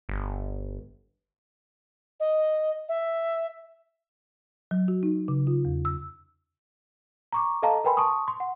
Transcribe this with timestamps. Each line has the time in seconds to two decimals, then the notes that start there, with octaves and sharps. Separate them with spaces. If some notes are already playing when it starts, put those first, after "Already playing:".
0.09 G1
2.19 D#5
2.88 E5
4.71 F#3
4.88 F#4
5.03 D#4
5.28 C#3
5.47 F4
5.65 E2
5.85 E6
7.33 A#5 C#6 D6
7.62 A4 D#5 F5 A5 A#5
7.84 A#4 B4 G5 G#5 B5 C6
7.97 A5 C6 C#6 D#6
8.28 C6
8.40 F#5